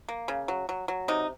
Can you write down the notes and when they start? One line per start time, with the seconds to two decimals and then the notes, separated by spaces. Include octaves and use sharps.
0.09 A#3
0.28 C#3
0.48 F#3
0.69 F#3
0.88 F#3
1.08 C3 D#4